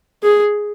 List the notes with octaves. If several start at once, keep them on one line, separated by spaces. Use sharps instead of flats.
G#4